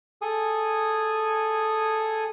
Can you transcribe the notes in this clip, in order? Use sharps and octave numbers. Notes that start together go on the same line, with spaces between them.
G#4 A4 G#5 D#6